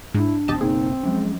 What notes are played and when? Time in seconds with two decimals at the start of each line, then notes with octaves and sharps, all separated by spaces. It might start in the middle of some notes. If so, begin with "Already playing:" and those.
0.15 G#2 D4 E4
0.48 G#1 E2 B2 C4 G4 D#5 A5
0.61 F#1 B2 A#3 D#4 G#4
1.03 F3 F#3 G#3 C#4